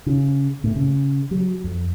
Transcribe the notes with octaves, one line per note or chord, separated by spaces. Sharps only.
C#3
A2
C#3
F#3
F2